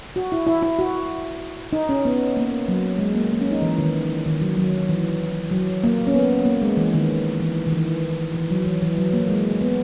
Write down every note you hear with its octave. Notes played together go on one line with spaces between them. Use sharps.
F#4
E4
E4
E4
F#4
D#4
C#4
B3
A#3
F#3
G#3
A#3
A#3
C#4
D#4
E3
D#3
D#3
F#3
F#3
E3
F#3
A#3
C#4
B3
A#3
G#3
E3
D#3
E3
D#3
E3
E3
F#3
E3
E3
F#3
A#3
G#3
B3